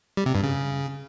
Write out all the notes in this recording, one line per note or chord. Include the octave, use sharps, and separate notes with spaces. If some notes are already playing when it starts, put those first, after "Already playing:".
G3
C3
G2
C#3